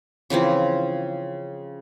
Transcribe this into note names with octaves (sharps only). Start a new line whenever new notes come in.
C#3 E3 F3 C4